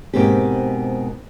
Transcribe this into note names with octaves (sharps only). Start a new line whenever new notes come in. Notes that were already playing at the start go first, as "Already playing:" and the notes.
G#2 B2 A#3 C4 G4